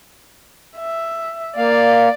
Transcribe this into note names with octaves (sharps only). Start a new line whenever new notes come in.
E5
A#3 D5 F5